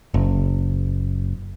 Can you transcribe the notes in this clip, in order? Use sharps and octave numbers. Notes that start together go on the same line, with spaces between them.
F#1